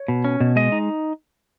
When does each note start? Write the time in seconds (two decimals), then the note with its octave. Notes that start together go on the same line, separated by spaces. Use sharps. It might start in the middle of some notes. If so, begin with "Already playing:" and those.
Already playing: C#5
0.08 B2
0.24 C#4
0.41 B2
0.56 G#3 D#5
0.72 D#4